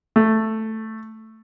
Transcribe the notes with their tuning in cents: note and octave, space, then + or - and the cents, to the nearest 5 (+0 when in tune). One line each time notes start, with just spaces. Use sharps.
A3 +5